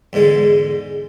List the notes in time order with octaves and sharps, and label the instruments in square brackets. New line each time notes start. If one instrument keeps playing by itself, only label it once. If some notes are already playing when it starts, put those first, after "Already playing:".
[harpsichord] E2 G#2 D3 G#3